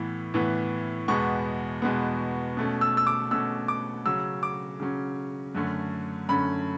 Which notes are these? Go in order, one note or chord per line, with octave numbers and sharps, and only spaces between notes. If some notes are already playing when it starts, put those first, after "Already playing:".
Already playing: A2 E3 B3
A2 E3 B3
E2 B2 G#3 B3 C#6
E2 B2 G#3 B3
B2 A3 C#4
E6
E6
D6
B2 A3 C#4 E6
D6
C#3 F#3 C#4 E6
D6
C#3 F#3 C#4
F#2 D3 A3 C#4
F#2 D3 A3 C#4 B5